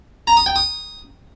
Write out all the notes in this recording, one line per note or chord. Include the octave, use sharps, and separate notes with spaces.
A#5
D#6
G5
D#6